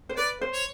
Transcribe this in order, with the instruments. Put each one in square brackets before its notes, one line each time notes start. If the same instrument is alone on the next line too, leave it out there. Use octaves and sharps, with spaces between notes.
[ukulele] C5
[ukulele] B4 [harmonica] D5
[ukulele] C5
[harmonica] C#5